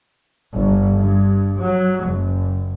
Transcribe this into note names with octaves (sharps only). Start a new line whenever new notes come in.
G1
G2
F#3
F#1